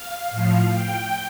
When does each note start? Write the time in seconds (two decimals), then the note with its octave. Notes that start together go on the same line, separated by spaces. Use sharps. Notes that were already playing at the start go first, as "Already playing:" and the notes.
Already playing: F5
0.31 A2 F3
0.73 G5